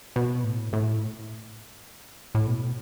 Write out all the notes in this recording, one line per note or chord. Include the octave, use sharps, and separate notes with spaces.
B2
A2
A2
A2
B2